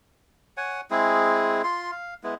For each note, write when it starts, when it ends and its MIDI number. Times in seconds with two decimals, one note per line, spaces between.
0.57 0.81 73
0.57 0.81 78
0.57 0.81 80
0.90 1.62 56
0.90 1.62 60
0.90 1.62 64
0.90 1.62 68
1.64 1.91 65
1.64 1.91 84
1.91 2.14 77
2.23 2.34 56
2.23 2.34 59
2.23 2.34 64